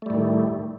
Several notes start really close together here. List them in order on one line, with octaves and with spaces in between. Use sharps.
A3 G3 A2 D#3